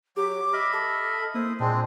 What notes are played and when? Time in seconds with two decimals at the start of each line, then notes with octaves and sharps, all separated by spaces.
0.17 F#3 G4 D6
0.53 D#5 E5 B5 F6
0.73 A4
1.34 A#3 E4 C5 D#6
1.60 A#2 G#3 C4 D4